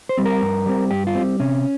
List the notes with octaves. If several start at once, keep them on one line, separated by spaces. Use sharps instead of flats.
C5
G3 C4
A#4
G2
G3 C4
G2 G4
F4
G3 C4
C3 C#4